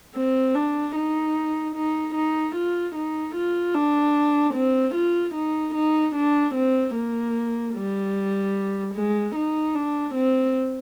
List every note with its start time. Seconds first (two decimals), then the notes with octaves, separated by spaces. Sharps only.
0.16 C4
0.55 D4
0.96 D#4
1.75 D#4
2.15 D#4
2.55 F4
2.95 D#4
3.35 F4
3.75 D4
4.55 C4
4.95 F4
5.35 D#4
5.75 D#4
6.15 D4
6.55 C4
6.95 A#3
7.75 G3
8.94 G#3
9.35 D#4
9.75 D4
10.15 C4